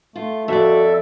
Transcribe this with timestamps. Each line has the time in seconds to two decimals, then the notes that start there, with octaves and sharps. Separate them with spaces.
0.15 A3 F4
0.48 F2 F#4 A4 D5 E5